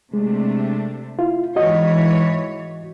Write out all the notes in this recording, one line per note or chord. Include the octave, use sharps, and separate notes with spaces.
C3 G#3 A3 D4
E4 F4
G#2 E3 F#4 C#5 D#5